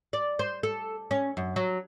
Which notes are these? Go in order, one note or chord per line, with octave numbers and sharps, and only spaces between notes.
D5
C5
A4
C#4
F#2
F#3